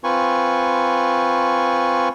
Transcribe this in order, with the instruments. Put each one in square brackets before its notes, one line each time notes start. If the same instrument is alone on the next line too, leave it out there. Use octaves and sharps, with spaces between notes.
[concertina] C4 F4 B4 G#5 C#6